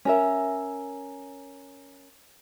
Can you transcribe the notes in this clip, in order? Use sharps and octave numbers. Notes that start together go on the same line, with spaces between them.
C#4 A#4 E5